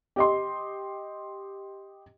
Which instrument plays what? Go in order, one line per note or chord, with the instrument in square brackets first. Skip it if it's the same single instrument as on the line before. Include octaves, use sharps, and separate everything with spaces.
[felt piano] G4 D#5 C6